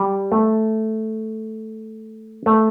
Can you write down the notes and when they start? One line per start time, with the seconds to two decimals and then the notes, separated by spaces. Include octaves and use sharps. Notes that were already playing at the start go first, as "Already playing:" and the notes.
Already playing: G3
0.32 A3
2.46 A3